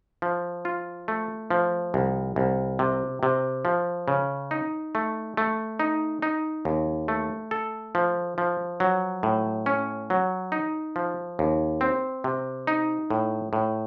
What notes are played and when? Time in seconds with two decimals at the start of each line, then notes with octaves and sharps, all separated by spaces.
0.22 F3
0.65 F4
1.08 A3
1.51 F3
1.94 C2
2.36 C2
2.79 C3
3.23 C3
3.65 F3
4.08 C#3
4.51 D#4
4.95 A3
5.37 A3
5.80 D#4
6.22 D#4
6.65 D#2
7.08 A3
7.51 A4
7.95 F3
8.38 F3
8.80 F#3
9.23 A2
9.66 C#4
10.10 F#3
10.52 D#4
10.96 F3
11.39 D#2
11.81 C4
12.24 C3
12.67 D#4
13.10 A2
13.53 A2